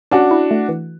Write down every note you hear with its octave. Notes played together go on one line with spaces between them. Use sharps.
C#4 D4 F#4
E4
A3
E3